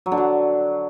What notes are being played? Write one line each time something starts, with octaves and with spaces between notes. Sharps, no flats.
F#3
D3
F#3